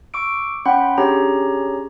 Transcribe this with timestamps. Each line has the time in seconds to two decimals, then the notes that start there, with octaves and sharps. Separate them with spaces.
0.14 C#6 D6 E6 D7
0.65 C#4 F#5 G5 B5 C6
0.98 C#4 D4 G4 G#4 C#5 A#5